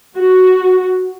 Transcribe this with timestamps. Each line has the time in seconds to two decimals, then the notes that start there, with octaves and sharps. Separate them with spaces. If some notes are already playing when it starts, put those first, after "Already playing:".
0.17 F#4